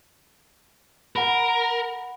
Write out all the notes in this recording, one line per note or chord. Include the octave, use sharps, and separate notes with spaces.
A#4 F#5 B5